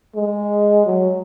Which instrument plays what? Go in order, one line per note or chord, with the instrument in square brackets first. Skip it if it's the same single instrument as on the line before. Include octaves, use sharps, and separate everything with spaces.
[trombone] G#3
F#3